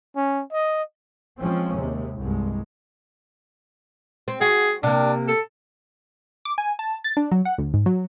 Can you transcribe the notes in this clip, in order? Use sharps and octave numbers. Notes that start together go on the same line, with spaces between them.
C#4
D#5
F3 G#3 C4 C#4
D#2 C3 G#3
C2 G2 G#3
C4
F#4 G#4
C3 A#3 D4
A4
D6
G#5
A5
A6
D4
F#3
F#5
D2
G#2
F#3